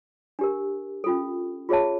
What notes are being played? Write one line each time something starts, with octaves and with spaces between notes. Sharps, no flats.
D4 G4 A#4
C#4 F4 A4
F4 G#4 C#5 E5 A5